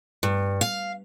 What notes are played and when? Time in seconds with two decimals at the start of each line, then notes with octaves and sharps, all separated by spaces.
0.23 G2
0.61 F5